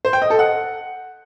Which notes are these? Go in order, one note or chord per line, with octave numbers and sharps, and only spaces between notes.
C5
G5
D#5
A4
F#5